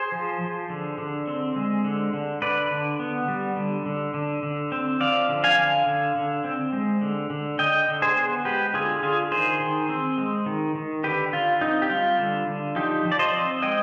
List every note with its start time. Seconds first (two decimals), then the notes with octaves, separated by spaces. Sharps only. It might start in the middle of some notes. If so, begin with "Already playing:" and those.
Already playing: G#4 C5
0.12 F3
0.41 F3
0.70 D3
0.98 D3
1.27 C4
1.56 G#3
1.84 D3
2.13 D3
2.42 D3 B4 D5
2.71 D3
2.99 B3
3.28 G3
3.56 D3
3.86 D3
4.14 D3
4.43 D3
4.72 C4
5.00 F3 D5 F5
5.29 D3
5.44 F5 G#5
5.58 D3
5.86 D3
6.15 D3
6.44 C4
6.73 G#3
7.01 D3
7.30 D3
7.59 D3 D#5 G5
7.88 D3
8.02 G#4 C5
8.17 B3
8.45 G#3 G4 B4
8.74 D3 F4 G#4
9.03 D3 F4 G#4
9.31 D#3 G#4 C5
9.60 D#3
9.89 C4
10.18 G#3
10.46 D#3
10.75 D#3
11.04 D3 G4 B4
11.32 D3 F4
11.61 C4 D#4
11.82 G4
11.90 G3 F4
12.19 D3
12.47 D3
12.76 F3 D#4 G4
13.05 F3
13.12 D5
13.19 C5 D#5
13.33 C4
13.62 G#3 D#5 G5